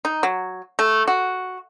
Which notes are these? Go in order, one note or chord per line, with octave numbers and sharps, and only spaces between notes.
D#4
F#3
A3
F#4